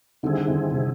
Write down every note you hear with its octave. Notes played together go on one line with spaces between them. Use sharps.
D3 D#3 G3 C4 E4 G#4
D3
C3